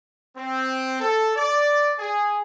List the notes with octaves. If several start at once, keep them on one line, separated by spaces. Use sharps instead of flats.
C4
A4
D5
G#4